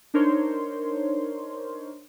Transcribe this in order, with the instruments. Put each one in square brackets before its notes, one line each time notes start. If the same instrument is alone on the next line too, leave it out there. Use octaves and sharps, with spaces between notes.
[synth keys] D4 D#4 A#4 C5 C#5 C6